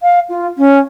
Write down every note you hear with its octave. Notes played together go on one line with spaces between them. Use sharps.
F5
F4
C#4